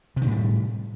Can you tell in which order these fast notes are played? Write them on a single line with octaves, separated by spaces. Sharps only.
C3 D#3 A2 G3